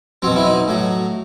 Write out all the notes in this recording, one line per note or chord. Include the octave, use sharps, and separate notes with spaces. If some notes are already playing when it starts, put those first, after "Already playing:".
B2 F#3 C4
E4
D#4
A2 F#3